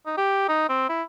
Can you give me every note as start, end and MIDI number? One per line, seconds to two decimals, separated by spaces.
0.06 0.17 63
0.17 0.48 67
0.49 0.65 63
0.69 0.89 60
0.89 1.03 64